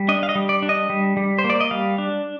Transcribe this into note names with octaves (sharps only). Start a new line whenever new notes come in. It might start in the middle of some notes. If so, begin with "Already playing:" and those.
Already playing: G3
D4 D#5
F5
D#5
G3
D5
D4
D#5
G3
G3
C5
A#3
D5
D#5
G3 F5
D4